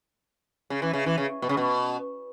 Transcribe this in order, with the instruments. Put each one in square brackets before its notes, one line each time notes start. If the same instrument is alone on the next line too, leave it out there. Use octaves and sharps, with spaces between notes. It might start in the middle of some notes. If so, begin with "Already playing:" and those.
[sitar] C#3
E3
C#3
E3
C#3
B2
C#3
B2